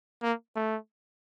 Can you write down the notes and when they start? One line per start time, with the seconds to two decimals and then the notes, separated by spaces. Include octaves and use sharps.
0.23 A#3
0.56 A3